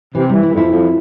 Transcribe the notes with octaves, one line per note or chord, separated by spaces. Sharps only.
C3 E3
E3 G3
E4
F2 E4
F2